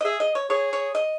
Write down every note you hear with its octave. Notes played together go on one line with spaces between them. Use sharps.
D#5
G#4 E5
D#5
C#5
G#4 C#5
C#5
D#5